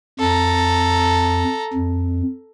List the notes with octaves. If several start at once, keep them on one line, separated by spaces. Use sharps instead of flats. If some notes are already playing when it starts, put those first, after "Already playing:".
F2 A4 A#5
F2